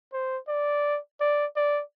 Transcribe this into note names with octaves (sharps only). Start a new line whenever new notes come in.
C5
D5
D5
D5